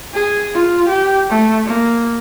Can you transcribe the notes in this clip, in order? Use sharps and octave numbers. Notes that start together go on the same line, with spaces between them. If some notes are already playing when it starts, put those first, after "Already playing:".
G#4
F4
G4
A3
A#3